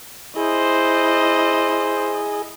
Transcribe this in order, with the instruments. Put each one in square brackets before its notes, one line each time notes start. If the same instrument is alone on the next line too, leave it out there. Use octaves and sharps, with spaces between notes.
[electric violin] E4 D#5 [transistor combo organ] G#4 [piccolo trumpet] C5